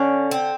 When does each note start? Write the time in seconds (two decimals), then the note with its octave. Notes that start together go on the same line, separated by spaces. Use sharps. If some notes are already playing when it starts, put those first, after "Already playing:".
Already playing: D3 C#4
0.31 C4